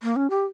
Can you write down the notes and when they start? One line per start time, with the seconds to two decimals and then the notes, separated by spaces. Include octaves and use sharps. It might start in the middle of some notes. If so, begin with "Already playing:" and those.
0.03 A#3
0.16 C#4
0.30 G4